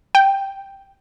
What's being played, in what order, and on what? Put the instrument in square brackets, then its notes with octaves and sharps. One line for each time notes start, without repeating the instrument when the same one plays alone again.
[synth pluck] G5